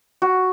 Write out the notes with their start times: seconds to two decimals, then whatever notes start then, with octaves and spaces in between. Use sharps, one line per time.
0.22 F#4